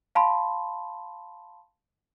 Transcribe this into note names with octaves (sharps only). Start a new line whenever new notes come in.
F5 A5 B5 C6